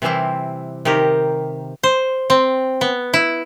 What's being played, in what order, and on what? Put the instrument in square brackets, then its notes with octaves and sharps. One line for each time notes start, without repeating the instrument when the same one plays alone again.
[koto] C3 E3 G3 C4 E4
C3 D#3 G4 A#4
C5
C4
B3
E4